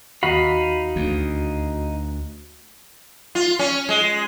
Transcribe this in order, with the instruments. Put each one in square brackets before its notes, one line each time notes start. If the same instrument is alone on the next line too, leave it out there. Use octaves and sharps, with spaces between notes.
[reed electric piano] D#2 F#4 [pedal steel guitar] D#4 F5 B5
[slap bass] D2
[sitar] F4
C#4
G#3